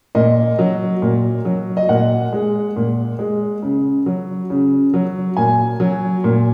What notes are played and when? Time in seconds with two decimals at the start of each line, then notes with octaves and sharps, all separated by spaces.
0.15 A#2 D#5
0.59 F#3
1.02 A#2
1.45 F#3
1.77 D#5
1.89 A#2 F#5
2.33 G#3
2.76 A#2
3.19 G#3
3.63 C#3
4.06 F#3
4.50 C#3
4.94 F#3
5.37 A#2 G#5
5.80 F#3
6.24 A#2